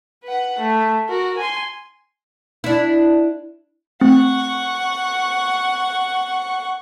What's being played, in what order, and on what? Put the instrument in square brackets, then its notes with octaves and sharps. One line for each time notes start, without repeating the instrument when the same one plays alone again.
[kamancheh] B4 F#5
A3
F#4 A#4
G#5 C6
[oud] D4 E4
[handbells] A3 C4 [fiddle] F#5 C#6